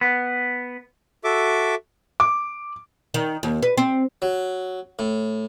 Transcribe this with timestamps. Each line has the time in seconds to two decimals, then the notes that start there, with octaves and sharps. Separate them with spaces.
0.01 B3
1.24 F#4 A4 E5 D6
2.20 D6
3.14 D#3
3.43 D#2
3.62 B4
3.77 C4
4.22 F#3
4.99 A2